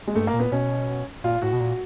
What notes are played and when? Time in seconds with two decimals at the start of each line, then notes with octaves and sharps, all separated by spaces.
0.07 G#3
0.15 G2 A3
0.27 A#3
0.33 A#2
0.40 B3
0.52 B2 C#4
1.24 A#2 F4
1.42 A2 F#4
1.53 B2
1.60 A#2